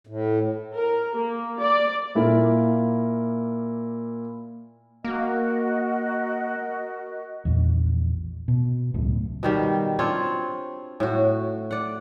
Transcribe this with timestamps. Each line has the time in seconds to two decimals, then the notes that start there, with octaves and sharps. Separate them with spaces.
0.07 A2
0.74 A#4
1.17 A#3
1.60 D5
2.15 A#2 A#3 E4 A#4
5.04 A#3 F#4 A#4 D#5
7.45 A#1 E2
8.48 B2
8.94 C#2 F#2 A2
9.43 B2 D#3 G3
9.99 C4 D4 F4 C#5
11.00 A2 F#4
11.71 D5 F#5